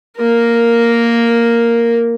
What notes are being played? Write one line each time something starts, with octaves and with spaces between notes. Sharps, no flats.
A#3 A#4